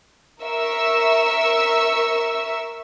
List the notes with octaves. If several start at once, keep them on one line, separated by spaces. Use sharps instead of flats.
A#4 E5 C#6 E6